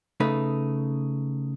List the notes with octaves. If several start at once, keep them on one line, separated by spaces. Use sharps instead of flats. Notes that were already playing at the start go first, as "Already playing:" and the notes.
C#3 A3 D#4 B4